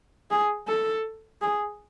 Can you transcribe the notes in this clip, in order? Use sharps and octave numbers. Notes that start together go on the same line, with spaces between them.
G#4
A4
G#4